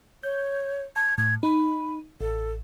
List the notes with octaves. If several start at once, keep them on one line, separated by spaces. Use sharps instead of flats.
C#5 G6
A5 G#6
A2 G#6
D#4 B5
A1 A4